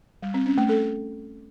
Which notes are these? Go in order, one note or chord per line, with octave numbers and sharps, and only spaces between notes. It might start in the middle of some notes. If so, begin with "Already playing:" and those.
G3
C4
C#4
A3
A4